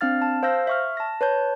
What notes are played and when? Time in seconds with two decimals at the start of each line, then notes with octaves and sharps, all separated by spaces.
0.01 C4 D4 F5 F6 A6
0.22 A5
0.43 C5 F5 E6 G6 A#6
0.67 E5 C#6 F6
0.97 A5 A#6
1.21 B4 C#5 A5 G6